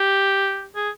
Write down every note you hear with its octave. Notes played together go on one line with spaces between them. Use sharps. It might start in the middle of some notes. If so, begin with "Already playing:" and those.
Already playing: G4
G#4